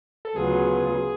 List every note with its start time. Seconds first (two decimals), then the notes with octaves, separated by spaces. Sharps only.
0.25 A4
0.36 D2 C#3 F#3 B3 F4 G#4